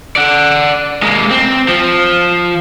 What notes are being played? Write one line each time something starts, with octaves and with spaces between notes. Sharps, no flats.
D5 F#5
G#3 A#3
C4
F3